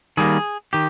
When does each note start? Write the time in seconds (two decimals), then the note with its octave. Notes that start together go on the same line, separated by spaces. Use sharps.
0.17 D#3 G3 A#3 G#4
0.73 D#3 G4